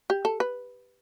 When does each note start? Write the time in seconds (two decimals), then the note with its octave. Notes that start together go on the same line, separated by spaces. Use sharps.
0.10 G4
0.25 A4
0.40 B4